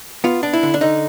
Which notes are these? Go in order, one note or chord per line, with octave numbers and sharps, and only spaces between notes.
B3 F4
D4
E4
D3
D4
D3 D#4